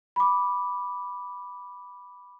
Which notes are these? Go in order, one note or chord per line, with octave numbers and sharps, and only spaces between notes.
B5 D6